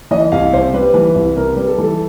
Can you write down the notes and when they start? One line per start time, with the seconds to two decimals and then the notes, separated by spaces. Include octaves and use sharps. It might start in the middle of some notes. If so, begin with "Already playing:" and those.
0.11 E3 D#5
0.32 C2 F5
0.52 C3 C5
0.74 G3 B4
0.94 E3
1.15 C2
1.36 C3 A#4
1.53 G3 B4
1.67 A4
1.78 E3 A4